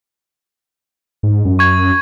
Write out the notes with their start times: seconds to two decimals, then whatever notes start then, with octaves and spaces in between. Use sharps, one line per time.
1.23 G#2
1.45 F#2
1.59 C#6 G#6